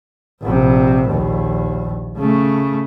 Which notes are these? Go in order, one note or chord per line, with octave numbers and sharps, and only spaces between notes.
A#1 C3
A#1 D#2
C#3 A3